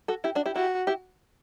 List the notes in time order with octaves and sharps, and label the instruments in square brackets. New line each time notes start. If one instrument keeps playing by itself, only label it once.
[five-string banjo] F#4 A4
E4 G4
D4 F#4
E4 G4
[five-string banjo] E4 G4 [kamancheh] F#4
[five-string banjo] E4 G4